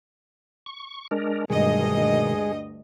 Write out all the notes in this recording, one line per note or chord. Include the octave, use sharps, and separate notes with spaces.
C#6
G#3 D4 A#4
D2 G2 B2 D#3 G#3 G#4 D#5